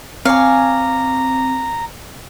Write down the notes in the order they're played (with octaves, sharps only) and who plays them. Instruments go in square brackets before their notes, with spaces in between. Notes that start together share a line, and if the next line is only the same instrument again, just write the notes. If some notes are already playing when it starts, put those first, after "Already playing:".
[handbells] C4 D6 [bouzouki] C#5 G#5 [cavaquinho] F5 [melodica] A#5